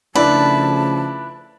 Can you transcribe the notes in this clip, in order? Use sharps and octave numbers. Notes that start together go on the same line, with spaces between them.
C#3 F3 A3 D4 E4 B4 D5 A5